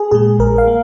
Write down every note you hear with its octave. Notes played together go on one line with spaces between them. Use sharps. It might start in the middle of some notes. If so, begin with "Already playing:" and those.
Already playing: G#4
A#2 G#3 G#4
A#1 A#4
F5
A#3